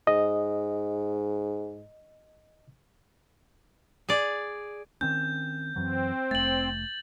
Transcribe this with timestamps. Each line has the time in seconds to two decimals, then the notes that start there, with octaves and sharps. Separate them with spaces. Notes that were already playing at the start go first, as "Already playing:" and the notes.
0.07 G#2 D#5
4.09 G#4 D5
5.01 D#3 C4 C#4 G6
5.76 F#2 E3 F#3 C4
6.31 F1 A3 A6 F#7